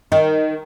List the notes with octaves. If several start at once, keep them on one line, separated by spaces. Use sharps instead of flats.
D#3